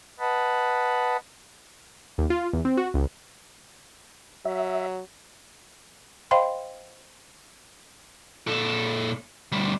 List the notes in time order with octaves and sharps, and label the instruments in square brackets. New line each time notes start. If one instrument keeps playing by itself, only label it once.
[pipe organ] B4 D#5 F#5 A5 B5
[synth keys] D#2
F4
E2
C4
F#4
C#2
[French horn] F#3 [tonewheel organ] E5
[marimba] C5 D#5 F5 G5 B5 C6
[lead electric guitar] A#2 A4
D2 G3